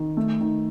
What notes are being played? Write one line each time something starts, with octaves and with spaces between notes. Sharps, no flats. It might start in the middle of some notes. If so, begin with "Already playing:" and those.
Already playing: D#3
A3
D#3